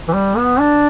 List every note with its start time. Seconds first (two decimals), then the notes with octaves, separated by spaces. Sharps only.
0.08 E3
0.14 G3
0.37 B3
0.60 D4